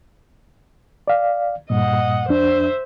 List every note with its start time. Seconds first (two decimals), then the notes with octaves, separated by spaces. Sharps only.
1.08 D5 F5
1.70 G2 A#2 D#5 F#5
2.29 F2 D4 C5 E5